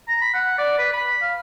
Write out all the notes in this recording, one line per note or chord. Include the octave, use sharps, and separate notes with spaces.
A#5
B5
F#5
D5
B4
B5
F5